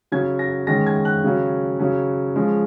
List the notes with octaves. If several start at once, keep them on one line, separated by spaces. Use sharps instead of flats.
C#3 F#3 C#4 G#6
A#6
D#3 G#3 C#4 A#6
G#6
F#6
C#3 F#3 C#4
C#3 F#3 C#4
F3 G#3 C#4